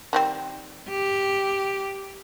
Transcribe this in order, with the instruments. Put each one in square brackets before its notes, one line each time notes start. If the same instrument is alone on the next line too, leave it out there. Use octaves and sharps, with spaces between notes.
[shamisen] D#3 G3 C4
[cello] G4